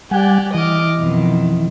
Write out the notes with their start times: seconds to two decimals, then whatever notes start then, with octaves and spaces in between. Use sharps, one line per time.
0.11 G3 G4 D5 F#5 G#5
0.54 E3 D#5 D6 F6
0.98 F2 B2 D#3